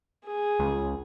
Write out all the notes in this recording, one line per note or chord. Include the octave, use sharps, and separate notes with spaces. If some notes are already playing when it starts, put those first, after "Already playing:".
G#4
C#2